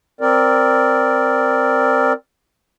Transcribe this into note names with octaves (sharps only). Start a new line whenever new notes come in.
C4 A#4 D5